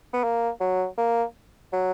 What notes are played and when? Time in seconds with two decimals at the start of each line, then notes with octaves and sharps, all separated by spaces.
0.13 B3
0.23 A#3
0.60 F#3
0.98 A#3
1.72 F#3